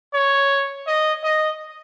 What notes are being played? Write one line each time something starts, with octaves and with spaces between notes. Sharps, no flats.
C#5
D#5
D#5